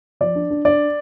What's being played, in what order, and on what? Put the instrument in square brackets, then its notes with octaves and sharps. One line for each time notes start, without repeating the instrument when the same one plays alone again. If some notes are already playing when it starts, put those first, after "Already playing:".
[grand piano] F3 D5
D4
D4
D4 D5